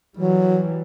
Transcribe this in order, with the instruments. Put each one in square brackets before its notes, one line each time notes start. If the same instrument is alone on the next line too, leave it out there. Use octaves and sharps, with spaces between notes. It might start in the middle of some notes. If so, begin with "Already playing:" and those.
[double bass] E3 G3 [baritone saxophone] F#3